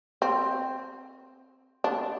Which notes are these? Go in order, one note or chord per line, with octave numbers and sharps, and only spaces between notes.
C4
D4